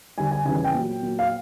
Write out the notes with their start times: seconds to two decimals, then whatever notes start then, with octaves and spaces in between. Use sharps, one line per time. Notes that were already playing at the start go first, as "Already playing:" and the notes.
0.18 D3 G3 G#5
0.31 G#5
0.45 C#3 E3 G3 G#5
0.56 G#5
0.64 G5
0.74 A#2 F#3
1.03 A#2 F#3
1.19 F5